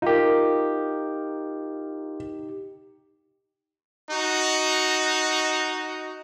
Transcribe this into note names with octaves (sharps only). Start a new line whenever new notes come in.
D#4 F4 G4 A#4
D#4 F#4